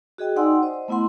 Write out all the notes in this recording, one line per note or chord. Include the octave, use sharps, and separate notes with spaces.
F#4 G#4 D#5 G5
D#4 D5 F#5 G#5 C6 E6
C5 D#5
A3 B3 E4 F#5 C6